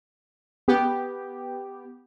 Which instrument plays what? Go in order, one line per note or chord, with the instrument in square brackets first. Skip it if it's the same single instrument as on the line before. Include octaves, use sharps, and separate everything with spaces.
[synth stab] B3 G4